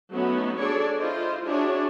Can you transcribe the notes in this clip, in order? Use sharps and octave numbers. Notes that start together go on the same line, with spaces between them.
F#3 A3 B3 C#4 D#4 F#4
D4 G#4 A4 C#5 D5
E4 F4 C5 D#5
D4 E4 F#4 G#4 C#5